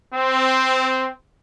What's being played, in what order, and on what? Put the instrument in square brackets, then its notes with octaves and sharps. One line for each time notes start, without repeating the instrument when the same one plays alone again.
[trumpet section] C4